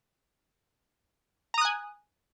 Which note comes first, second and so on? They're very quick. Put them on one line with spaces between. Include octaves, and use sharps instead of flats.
A#5 D#6 F#6 G#5